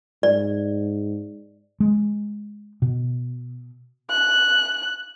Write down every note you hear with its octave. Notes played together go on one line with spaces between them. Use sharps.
G#2 D5
G#3
B2
F#6